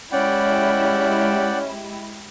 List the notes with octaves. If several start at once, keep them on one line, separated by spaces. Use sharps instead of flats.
G#3 C#4 E4 G4 D5 F#5 G5